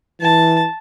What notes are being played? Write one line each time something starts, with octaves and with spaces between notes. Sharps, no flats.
E3 A5